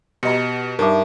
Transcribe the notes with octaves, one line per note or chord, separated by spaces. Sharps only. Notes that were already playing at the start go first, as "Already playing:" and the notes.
B2 G4 D#5 A#5 C#7
G2 D#4 A#4 E5 A5 D6